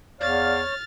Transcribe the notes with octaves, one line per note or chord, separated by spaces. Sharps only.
E2 C#5 D5 F5 F6 A6